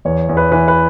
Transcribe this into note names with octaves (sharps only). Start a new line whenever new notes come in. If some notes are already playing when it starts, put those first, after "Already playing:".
E2 C#5
E2
B4
E3 B4
B4